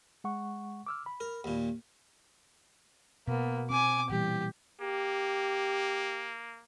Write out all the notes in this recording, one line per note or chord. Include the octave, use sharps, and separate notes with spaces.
G#3 F#5 C#6
D6 E6 F6
B5
A#4
D#2 A#2
B2 A#3 B3
C4 G#5 D6
A#2 E3 G3 G4
A#3 G4